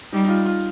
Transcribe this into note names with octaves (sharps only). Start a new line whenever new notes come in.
G3 D#4
D#4
F4
F4